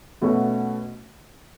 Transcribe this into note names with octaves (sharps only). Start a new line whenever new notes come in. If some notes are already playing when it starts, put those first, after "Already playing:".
B2 A3 C#4 F#4